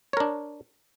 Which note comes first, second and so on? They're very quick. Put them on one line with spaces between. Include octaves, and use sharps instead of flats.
C#5 A#4 D4